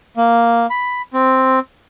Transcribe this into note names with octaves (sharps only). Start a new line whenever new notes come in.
A#3
B5
C4